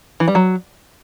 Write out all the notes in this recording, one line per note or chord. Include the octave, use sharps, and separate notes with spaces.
E3
G3
F#3